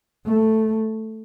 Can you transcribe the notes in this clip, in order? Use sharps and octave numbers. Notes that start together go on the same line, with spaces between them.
A3